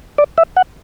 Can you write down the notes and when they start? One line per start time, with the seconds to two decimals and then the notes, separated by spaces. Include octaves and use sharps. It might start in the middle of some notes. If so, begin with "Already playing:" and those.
0.18 D5
0.38 E5
0.57 F#5